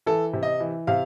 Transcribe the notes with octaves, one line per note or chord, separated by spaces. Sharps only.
E3 A4
C3
D#5
E3
C3 F5